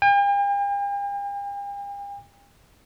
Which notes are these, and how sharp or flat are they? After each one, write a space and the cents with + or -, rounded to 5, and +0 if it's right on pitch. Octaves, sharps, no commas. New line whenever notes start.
G5 +45